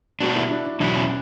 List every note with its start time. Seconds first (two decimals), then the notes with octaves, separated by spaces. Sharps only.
0.21 B2 G3 B3 D4 F#4
0.36 E4
0.51 D4
0.66 D4
0.80 E2 B2 F#3 B3 D4 E4
0.96 C#4